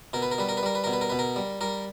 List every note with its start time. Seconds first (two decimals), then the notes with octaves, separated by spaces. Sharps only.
0.13 B2 A#4
0.22 B4
0.31 A#4
0.38 G3 B4
0.49 A#4
0.57 B4
0.63 G3 A#4
0.75 B4
0.84 B2 A#4
0.93 B4
1.01 A#4
1.10 B2 B4
1.19 A#4
1.36 G3
1.61 G3 A#4